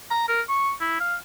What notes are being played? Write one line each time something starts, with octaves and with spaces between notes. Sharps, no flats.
A#5
A#4
C#6
E4
F5